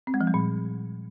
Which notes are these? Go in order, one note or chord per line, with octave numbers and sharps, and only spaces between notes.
C4
G#3
F3
G3
A#2